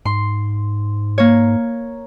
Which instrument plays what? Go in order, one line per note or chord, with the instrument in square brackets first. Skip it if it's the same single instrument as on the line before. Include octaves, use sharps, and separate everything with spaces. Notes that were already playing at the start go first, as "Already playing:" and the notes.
[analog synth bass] G#2 [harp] C6
[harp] A#3 C#5